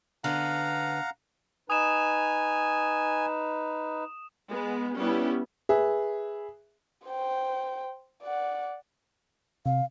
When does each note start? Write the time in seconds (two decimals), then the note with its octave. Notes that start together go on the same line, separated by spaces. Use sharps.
0.24 D3 B3 C#4 F5 F#5 A#5
1.70 D#4 B4 G#5 D#6 E7
4.50 G#3 B3
4.97 G3 B3 C#4 E4
5.69 G#4 B4 E5
7.07 C5 G5
8.23 D5 F#5
9.66 C3 F5